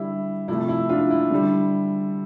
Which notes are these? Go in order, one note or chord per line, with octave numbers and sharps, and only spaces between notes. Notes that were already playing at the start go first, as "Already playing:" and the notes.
Already playing: D3 G3 E4
C3 F3 A3 E4
E4
D4 F4
E4
D3 G3